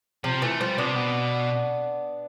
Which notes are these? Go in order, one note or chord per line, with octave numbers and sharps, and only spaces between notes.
C3 F3
E3 A3
F3 G3
C3 B3 D4
B2